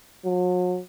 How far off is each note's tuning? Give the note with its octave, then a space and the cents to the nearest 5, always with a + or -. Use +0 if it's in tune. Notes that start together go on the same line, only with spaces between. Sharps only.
F#3 -40